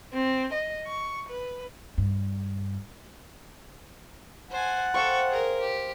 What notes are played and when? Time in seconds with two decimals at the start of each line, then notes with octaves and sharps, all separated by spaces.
0.14 C4
0.53 D#5
0.87 C#6
1.29 B4
1.98 G2
4.51 C5 F#5 G#5 A5
4.94 A4 C5 F5 G5 C#6
5.29 G#4 A#4
5.61 G4